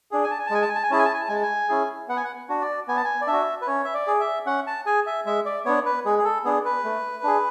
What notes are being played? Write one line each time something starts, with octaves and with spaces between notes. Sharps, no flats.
D4 G#4
G#5
A5
G#5
A5
G#3 G#5
A5
G#5
A5
G#5
C#4 E4 G#4 A5
G#5
A5
G#5
A5
G#3 G#5
A5
G#5
C#4 E4 G#4
B3 F#5
G#5
F#5
D4 F#4
D5
B3 G#5
A5
G#5
D5
D4 E5
F#4
B4
C#4 C#5
E5
D5
G#4
E5
C#4 F#5
A5
G#4 G#5
E5
G#3 E5
D5
B3 D4 C#5
B4
G#3 G#4
G#4
A4
B3 D4 G#4
B4
A3
D4 G#4